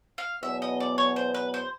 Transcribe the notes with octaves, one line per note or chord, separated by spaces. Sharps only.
F5
E2 B2 F#3 B3 E5
D#5
D5
C#5
C5
B4
C5